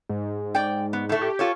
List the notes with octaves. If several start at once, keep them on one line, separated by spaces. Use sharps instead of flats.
G#2
D5 G5
B3
A2 A3
G4
F4 A4 C#5